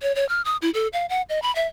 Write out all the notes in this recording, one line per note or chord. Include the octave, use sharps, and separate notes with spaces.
C#5
C#5
F6
D#6
E4
A4
F5
F#5
D#5
B5
E5